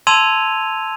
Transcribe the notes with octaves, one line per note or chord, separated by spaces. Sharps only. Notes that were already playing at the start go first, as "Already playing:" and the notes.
A5 C6 E6 G#6 D#7 F7